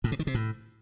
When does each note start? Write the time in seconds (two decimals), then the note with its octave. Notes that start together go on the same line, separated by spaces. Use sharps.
0.04 A2
0.12 C3
0.19 D#3
0.27 C3
0.35 A2